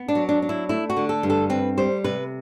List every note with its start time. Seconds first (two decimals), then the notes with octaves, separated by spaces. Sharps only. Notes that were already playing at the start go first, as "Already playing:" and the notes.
Already playing: B3
0.08 D4
0.15 F#3
0.29 D4
0.42 D4
0.49 E4
0.69 A3 E4
0.90 F#4
0.97 D3
1.09 A4
1.23 G2
1.30 A4
1.50 C4 B4
1.77 G3 C5
2.04 C3 B4